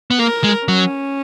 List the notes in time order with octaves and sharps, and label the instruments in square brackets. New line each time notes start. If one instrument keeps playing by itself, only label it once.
[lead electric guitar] B3
[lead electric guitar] A#3 [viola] A#4
[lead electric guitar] G#3
[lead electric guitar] F#3 [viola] C#4